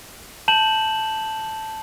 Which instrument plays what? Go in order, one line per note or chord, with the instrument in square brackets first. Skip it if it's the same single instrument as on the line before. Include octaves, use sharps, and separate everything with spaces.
[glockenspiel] A5 G6 E7 F#7